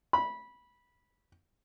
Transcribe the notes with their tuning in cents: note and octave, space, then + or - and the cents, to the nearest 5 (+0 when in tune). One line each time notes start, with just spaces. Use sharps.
B5 -15